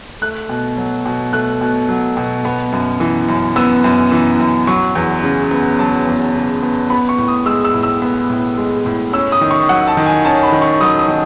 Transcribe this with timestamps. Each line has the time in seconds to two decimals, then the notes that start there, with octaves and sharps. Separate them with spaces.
0.22 A3 F#6
0.49 B2
0.77 F#3
1.05 B2
1.33 A3 F#6
1.61 B2
1.89 F#3
2.17 B2
2.45 B3
2.72 F#2
3.00 E3
3.28 F#2
3.56 B3 E6
3.84 F#2
4.12 E3
4.40 F#2
4.67 F#3 C#6
4.95 E2
5.24 C#3
5.51 B3
5.79 F#3 A5
6.07 E2
6.34 C#3
6.63 B3
6.90 B3 B5
7.09 C#6
7.18 A2
7.28 D#6
7.46 G#3 E6
7.64 E6
7.74 A2
7.83 E6
8.02 B3
8.30 A2
8.58 G#3
8.86 A2
9.13 C#4 E6
9.32 D#6
9.41 D#3
9.51 C#6
9.69 F#3 F#5
9.87 A5
9.97 D#3
10.06 G#5
10.24 C#4 A5
10.43 B5
10.52 D#3
10.62 C#6
10.81 F#3 D#6
10.99 D#6
11.08 D#3